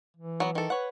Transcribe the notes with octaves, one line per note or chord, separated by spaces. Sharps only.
E3
F#3 B3
D#3 A4
B4 C#5 F#5